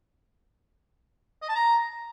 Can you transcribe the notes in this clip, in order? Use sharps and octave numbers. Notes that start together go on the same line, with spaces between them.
D#5
A5
A#5